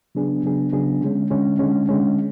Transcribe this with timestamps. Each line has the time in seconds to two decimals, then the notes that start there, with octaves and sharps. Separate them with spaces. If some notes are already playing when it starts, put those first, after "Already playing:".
0.15 C#3 F#3 B3 D4 G#4
0.43 C#3 F#3 B3 D4 G#4
0.72 C#3 F#3 B3 D4 G#4
1.01 D3 G#3 C#4
1.30 D3 G#3 C#4
1.59 D3 G#3 C#4
1.89 D3 G#3 C#4